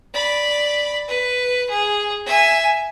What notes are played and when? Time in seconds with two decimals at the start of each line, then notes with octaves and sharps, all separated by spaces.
0.14 D5 B5
1.08 B4
1.70 G#4
2.26 E5 G#5